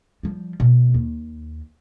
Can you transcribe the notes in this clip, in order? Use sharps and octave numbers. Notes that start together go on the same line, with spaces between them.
F3 G3
B2
D#2